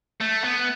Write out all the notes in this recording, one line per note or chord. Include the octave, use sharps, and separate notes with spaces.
A3
B3